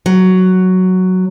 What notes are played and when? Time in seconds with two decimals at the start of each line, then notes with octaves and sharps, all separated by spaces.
0.06 F#3